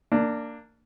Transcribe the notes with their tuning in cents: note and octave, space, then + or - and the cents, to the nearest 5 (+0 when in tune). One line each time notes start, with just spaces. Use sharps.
A#3 -20 D4 +0